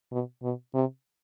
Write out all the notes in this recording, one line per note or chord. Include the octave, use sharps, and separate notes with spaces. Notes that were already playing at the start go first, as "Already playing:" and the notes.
B2
B2
C3